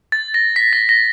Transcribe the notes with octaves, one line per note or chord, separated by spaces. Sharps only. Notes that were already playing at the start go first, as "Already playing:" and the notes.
A6
A#6
B6
A#6
A#6